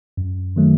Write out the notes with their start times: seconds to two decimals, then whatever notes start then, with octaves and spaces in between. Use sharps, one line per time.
0.17 F#2
0.56 D#3 F#3 A3